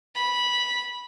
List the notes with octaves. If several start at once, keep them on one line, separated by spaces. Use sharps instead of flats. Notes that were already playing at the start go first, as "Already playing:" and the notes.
B5